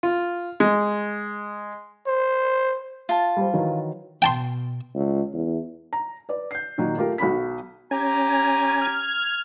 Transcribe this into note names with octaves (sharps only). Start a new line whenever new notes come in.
F4
G#3
C5
F4 A5
G3 C5
D#3 E3 F#3
B2 G5 A5 C6
C#2
E2
A#5
B4 D5
G6 C7
A#2 D#3 F#3 D#4
A3 F4 G4 A#4
B1 F#4 B5 B6
C#4 G4 G#5 A#5
F6 G#6